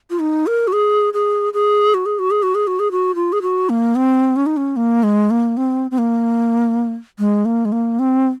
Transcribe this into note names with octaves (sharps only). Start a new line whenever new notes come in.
F4
D#4
A#4
F#4
G#4
G#4
G#4
F#4
G#4
F#4
G#4
F#4
G#4
F#4
G#4
F#4
F4
G#4
F#4
A#3
C4
C#4
D#4
C#4
A#3
G#3
A#3
C4
C4
A#3
G#3
A#3
G#3
A#3
C4